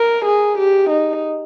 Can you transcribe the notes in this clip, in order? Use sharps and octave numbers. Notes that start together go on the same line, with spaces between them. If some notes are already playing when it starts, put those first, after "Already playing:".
Already playing: A#4
G#4
G4
D#4